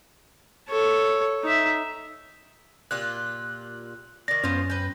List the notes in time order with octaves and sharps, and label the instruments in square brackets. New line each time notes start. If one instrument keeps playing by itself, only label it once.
[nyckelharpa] A4 C#5
D#4 E5
[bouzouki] A#2 F4 G4 [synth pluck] F#6
[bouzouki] D#3 D5 [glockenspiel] A#6
[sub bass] F#2 [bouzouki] B3 F4 C5 [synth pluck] C#4
[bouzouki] B4 G5